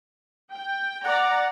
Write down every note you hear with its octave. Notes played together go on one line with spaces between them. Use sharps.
G5
D5 F#5 A#5